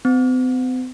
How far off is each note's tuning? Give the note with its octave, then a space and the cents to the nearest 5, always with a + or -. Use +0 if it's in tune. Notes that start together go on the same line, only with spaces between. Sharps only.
C4 -45